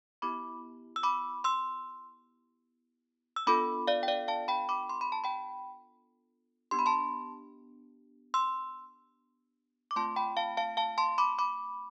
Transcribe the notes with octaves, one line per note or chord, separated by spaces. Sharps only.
B3 E4 G4 B5 D6
E6
B5 D6
C6 E6
E6
B3 D4 F4 A4 B5 D6
D5 F5
G5
D5 F5
F5 A5
G5 B5
B5 D6
C6
B5
A5
G5 B5
B3 D4 G4 C6
B5
A5 C6
C6 E6
D6
A3 C4 F4 A5 C6
G5 B5
F5 A5
F5 A5
F5 A5
A5 C6
B5 D6
B5 D6